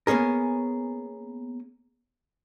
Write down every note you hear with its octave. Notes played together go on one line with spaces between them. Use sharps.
A#3 B3 C#4 G#4 A#4